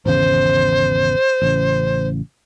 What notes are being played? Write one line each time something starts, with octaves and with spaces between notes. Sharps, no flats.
G#1 E2 C#3 C5
A1 C#3